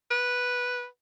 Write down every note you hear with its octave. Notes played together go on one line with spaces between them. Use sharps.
B4